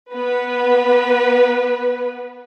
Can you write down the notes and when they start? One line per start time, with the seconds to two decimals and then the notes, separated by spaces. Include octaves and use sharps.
0.11 B3 B4